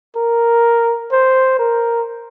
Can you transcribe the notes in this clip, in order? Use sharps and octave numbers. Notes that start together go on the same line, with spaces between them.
A#4
C5
A#4